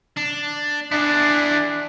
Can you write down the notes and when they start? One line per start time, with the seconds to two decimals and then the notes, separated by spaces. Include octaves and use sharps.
0.17 D4
0.92 D4 E4 G#4